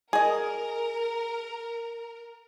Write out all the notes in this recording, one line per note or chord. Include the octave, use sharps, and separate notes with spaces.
G#4 A#4 D#5